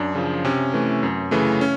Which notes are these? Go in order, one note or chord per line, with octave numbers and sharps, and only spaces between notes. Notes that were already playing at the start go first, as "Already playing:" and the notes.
Already playing: F#2 D4
C#3 F3
C3 C#4
E3 A3
F#2
C#3 E3 A3
C#4